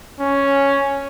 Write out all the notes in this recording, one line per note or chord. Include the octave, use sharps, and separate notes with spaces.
C#4